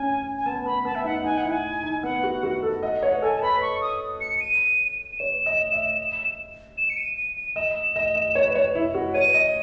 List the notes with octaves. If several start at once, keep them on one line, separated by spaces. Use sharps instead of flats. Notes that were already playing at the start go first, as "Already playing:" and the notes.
Already playing: C#4 G#5
C#4
G#5
B3 A5
B3 B5
B3 A5
E5
D#4 F#5
D#4 G#5
F#5
E4
G#5
D#4
B3 F#5
F#4
F#4
A4
D#5 F#5
C#5 F#5
A4 G#5
A5
B4 B5
C#6
D#6
C#7
D#7
D#7
C#5 E7
D#5
E5
E7
C#7
D#7
D#7
D#7
D#5 E7
D#5
D#5
C#5
B4
C#5
E4
F#4
C#5 D#7
D#5